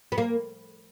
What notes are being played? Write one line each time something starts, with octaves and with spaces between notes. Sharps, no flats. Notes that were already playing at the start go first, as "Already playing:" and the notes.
B3
A#3